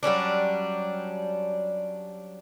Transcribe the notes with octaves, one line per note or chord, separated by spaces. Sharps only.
F#3 G3 C#4 D4